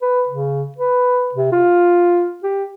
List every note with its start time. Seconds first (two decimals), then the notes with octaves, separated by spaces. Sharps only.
0.02 B4
0.29 C#3
0.78 B4
1.35 C3
1.52 F4
2.43 G4